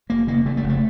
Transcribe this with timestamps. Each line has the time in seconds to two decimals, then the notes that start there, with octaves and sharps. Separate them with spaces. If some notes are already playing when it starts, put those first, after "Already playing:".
0.09 F1 A#3
0.27 C#3 A#3
0.46 C#3 A3
0.57 A3
0.64 F1
0.69 A3